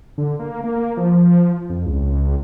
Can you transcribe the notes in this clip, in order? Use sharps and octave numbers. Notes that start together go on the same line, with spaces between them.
D3
A#3
A#3
F3
F2
C#2